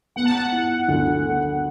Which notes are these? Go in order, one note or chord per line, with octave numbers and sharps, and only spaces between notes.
B3 F#5
A5
F#5
E4
D2
D3